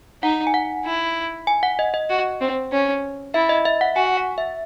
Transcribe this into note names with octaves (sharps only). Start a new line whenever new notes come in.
D#4 F#5
G#5
F#5
E4
G#5
F#5
D#5
D#5
F#4
C4
C#4
E4 E5
D#5
E5
F#5
F#4 G#5
F#5
E5